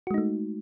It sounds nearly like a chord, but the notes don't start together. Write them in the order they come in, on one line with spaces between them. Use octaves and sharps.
F#4 G#3 D#4 A3